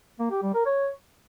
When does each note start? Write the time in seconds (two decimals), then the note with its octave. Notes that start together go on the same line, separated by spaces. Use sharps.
0.19 A#3
0.31 G4
0.43 G3
0.54 A#4
0.66 C#5